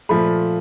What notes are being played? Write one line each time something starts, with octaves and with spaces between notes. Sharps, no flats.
A#2 F3 A3 B5